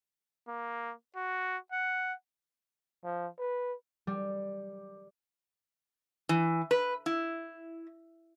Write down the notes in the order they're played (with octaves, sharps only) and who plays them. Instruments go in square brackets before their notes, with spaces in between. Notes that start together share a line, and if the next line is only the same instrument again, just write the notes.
[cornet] A#3
F#4
F#5
[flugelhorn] F3
B4
[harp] G3
[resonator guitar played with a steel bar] E3
B4
E4